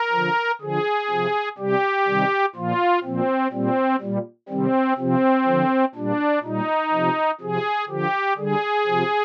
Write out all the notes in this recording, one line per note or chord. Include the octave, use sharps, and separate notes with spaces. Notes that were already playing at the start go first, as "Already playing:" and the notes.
Already playing: A#4
D3 F3
D3 F3 G#4
C3 F3
C3 G3 G4
C3 D#3 G3
A#2 F3 F4
A#2 F3 C4
A#2 G3 C4
A#2 G3
C3 D#3 G3 C4
C3 F3 C4
D3 F3
A#2 G3 D4
A#2 G3 D#4
C3 F3
C3 F3 G#4
D3 F3 G4
D3 G3 G#4
C3 F3